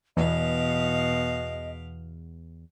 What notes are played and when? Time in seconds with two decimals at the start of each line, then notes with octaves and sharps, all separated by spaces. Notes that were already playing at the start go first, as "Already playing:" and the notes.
0.17 E2 B2 D#5 F5